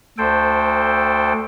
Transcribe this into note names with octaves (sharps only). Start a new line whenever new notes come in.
D2 A4 C5 G5